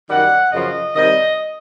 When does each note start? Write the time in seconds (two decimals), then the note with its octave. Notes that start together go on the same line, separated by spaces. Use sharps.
0.09 F#2 D#3 G3 F#5
0.51 F#2 C#3 F3 D#5
0.94 C3 D#3 G3 D#5